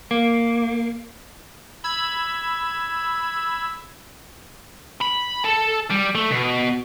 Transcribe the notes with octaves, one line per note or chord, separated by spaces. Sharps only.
A#3
B5 E6 G#6
B5
A4 A5
G3
A3
B2